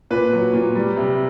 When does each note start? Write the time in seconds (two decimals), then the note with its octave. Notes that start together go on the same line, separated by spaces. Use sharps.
0.11 A#2 B4
0.33 F#3
0.54 A#2
0.75 G3
0.97 C3